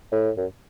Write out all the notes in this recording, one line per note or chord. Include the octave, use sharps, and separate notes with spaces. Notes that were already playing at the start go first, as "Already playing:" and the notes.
A2
F#2